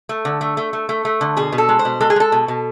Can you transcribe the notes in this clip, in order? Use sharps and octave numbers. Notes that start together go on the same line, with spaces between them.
A3
D3
A3
A3
A3
A3
A3
D3
B2 G#4
B2
A4
G#3
C5
B2
G#3 A4
G#4
G#3 A4
B2
B2